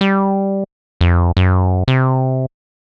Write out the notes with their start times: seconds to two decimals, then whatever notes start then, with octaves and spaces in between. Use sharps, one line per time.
0.01 G3
1.01 F2
1.37 F#2
1.88 C3